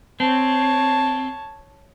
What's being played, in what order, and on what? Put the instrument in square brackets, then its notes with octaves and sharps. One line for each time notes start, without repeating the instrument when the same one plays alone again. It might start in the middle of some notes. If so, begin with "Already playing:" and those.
[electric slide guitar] C4 [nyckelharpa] C#5 A5